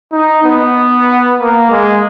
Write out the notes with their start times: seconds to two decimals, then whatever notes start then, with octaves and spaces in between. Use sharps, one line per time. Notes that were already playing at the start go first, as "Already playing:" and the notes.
0.12 D#4
0.44 B3
1.39 A#3
1.71 G#3